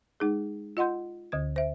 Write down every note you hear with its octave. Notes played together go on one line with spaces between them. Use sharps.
G#3 D#4 G#4
F4 D#5 F#5 C6 G6
D2 D3 G#6
C5 E5